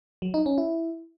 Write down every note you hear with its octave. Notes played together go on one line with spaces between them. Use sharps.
F#3
D#4
C#4
E4